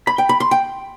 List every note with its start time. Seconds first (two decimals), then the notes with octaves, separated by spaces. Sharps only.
0.07 B5
0.18 G5
0.29 B5
0.40 C6
0.51 G5